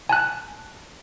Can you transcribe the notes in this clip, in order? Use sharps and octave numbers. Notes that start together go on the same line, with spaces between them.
G#5 A5 F#6